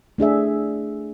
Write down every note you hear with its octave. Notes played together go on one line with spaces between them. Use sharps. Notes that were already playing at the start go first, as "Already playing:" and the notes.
A3 D4 G#4 E5